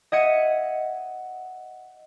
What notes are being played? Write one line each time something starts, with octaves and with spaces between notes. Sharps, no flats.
D#5 E5 F#5 G#6 C#7 D#7